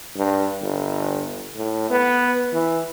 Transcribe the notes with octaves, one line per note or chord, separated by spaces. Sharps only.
G2
G1
A2
B3
E3